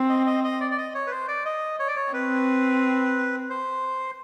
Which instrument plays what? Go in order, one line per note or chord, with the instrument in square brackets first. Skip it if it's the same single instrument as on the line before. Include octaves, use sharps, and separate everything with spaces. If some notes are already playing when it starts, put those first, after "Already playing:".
Already playing: [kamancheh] C4
[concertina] D#5
D#5
D#5
D5
D5
D#5
C#5
B4
C5
D5
D#5
C#5
D5
C#5
[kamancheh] C4 [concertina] B4
[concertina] C5